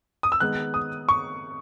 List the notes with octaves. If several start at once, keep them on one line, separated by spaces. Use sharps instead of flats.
D#6
E6
D#3 G#3 B3 F#6
D#6
C#6